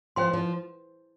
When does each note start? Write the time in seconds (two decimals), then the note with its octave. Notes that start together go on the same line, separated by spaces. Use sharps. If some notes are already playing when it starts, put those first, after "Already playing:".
0.16 F3 C5 G5 C6
0.33 F3